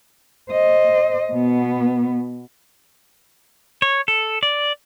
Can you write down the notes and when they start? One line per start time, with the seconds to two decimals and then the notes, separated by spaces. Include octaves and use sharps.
0.50 C5 D#5
1.33 B2 B3
3.82 C#5
4.08 A4
4.43 D5